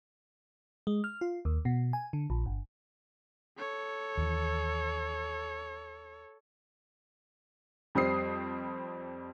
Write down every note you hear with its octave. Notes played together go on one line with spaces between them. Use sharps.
G#3
F6
F4
D#2
B2
G#5
D3
A#1
G1
A4 C#5
D#2 E3
F2 G3 C4 D#6 C7